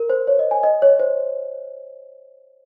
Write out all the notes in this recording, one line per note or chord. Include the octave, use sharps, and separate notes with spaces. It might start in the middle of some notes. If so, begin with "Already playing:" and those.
Already playing: A#4
C5
C#5
D#5
G#5
D#5
C#5
C5